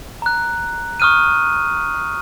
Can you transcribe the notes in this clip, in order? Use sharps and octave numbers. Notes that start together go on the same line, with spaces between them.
A#5 F#6
C#6 D#6 F6 F#6 D#7